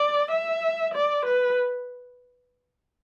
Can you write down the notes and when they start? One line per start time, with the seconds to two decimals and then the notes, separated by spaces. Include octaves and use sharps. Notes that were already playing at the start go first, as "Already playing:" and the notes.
Already playing: D5
0.31 E5
0.94 D5
1.26 B4